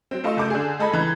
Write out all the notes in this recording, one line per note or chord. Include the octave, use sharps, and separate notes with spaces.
F#3 C4
A3 F4 D#5 C6 C#6 E6
F#1 A3 D6 G6
D3 G#4
G#3 A4 D#5 B5 G#6
C#2 E3 A#5 G#6